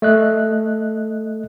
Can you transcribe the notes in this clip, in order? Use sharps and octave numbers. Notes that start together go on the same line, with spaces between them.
A3 D#5 F#6